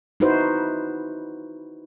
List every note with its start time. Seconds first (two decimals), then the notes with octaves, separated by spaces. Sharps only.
0.20 D#4 E4 F#4 B4 C5